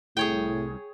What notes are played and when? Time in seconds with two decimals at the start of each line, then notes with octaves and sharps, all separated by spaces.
0.17 C2 A2 G#4 C#5 G5